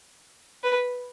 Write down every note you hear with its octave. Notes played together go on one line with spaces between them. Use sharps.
B4